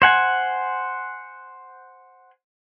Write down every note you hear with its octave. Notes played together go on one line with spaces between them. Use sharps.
C5 F#5 G#5